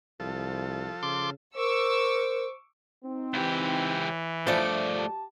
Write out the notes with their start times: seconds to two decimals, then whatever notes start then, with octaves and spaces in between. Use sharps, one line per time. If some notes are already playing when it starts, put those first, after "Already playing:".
0.20 C2 F3 A4
1.03 C#3 C6 D6
1.56 A#4 C5 C#6 D6 E6
3.05 C4 D#4
3.34 C#2 E3 G4
4.47 G2 F3 A3 D4 C5 D5 E5
4.97 G4 A5